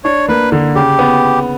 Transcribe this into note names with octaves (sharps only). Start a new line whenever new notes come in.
D4 C#5
A#3 B4
D3
C#3 G4
B3